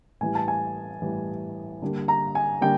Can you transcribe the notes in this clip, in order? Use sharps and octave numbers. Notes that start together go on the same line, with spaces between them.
A2 E3 G3 G#5
A5
G#5
A2 E3 G3
D3 G3 A#3
A#5
G#5
D3 G3 A#3 G5